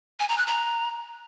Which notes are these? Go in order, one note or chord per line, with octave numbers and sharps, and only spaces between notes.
G#5
A#5
F#6
A#5